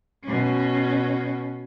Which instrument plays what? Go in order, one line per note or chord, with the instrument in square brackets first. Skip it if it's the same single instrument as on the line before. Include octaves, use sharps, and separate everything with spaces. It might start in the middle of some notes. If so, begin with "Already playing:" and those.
[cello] B2 C#4